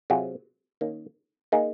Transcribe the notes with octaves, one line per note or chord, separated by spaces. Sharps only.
C3 F#3 C4 F4 G#4
D#3 A#3 C#4
A#3 D#4 G#4